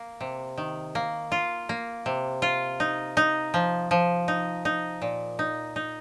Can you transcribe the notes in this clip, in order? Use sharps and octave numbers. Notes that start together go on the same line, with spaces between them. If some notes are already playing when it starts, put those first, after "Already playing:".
Already playing: A#3
C3
D#3
A#3
F4
A#3
C3
F4
D#4
D#4
F3
F3
D#4
D#4
A#2
D#4
D#4